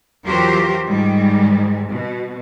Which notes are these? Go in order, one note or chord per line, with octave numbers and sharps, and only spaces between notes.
E2 F#3 F4 G4 A#4 C5
G#2 D#3 G3
B2